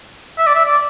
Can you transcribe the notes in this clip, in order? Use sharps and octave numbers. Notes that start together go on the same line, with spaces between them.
E5
D5
E5
D5